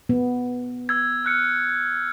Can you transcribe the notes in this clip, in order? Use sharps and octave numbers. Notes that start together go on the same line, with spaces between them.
B3
E6 G#6
F6 F#6 C#7